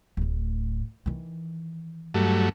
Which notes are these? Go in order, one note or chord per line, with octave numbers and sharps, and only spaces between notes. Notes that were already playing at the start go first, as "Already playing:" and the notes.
D1 A2
D#3 E3
G2 F#3 A3